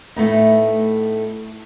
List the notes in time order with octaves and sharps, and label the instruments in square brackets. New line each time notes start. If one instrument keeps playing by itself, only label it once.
[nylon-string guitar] A2 A3 B3 D#4